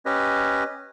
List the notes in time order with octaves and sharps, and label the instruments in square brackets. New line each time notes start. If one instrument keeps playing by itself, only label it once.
[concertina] C#4 G4 B4 D#5